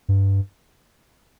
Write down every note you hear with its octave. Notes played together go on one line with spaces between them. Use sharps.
G2